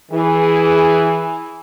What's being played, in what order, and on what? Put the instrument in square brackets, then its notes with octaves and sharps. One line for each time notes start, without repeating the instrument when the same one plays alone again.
[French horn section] E3 G#4